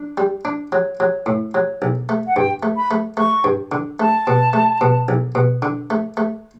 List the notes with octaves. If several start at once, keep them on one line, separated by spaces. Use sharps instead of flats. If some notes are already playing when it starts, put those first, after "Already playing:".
Already playing: D4
G3
D4
F#3
F#3
A2
F#3
B1
A3
F#5
G2 G5
A3
B5
A3
A3 C#6
G2
D3
A3 A5
B2
A3
B2
B1
B2
D3
A3
A3